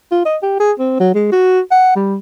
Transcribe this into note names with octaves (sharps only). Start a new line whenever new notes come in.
F4
D#5
G4
G#4
C4
F#3
G#3
F#4
F#5
G3